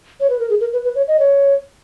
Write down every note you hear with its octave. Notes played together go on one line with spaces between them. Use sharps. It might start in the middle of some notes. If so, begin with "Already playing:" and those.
C#5
B4
A#4
G#4
A#4
B4
B4
C#5
D#5
C#5